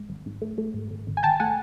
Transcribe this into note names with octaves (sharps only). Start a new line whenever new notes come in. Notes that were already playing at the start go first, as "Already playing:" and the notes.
Already playing: G#2
G#1
G#2
A3
A3
G#2
G#1
G#1
G#5
G#1 G5 A5
A3 F#5 G#5